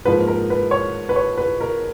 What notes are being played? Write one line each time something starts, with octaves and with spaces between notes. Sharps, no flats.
G#2 F3 A#3 B4
A#4
B4
C#5
B4
C#5
B4
A#4